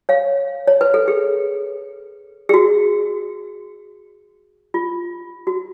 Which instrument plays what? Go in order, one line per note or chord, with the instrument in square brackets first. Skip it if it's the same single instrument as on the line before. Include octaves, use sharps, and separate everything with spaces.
[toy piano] C#5 F5
C#5
B4
A4
G#4
G#4
F#4
F4
F#4